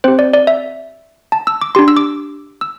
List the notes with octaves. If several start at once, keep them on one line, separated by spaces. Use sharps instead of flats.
C4 G4 C5
D5
D5
E5
A5
E6
D6
D4 G4 C6
E6
D6
E6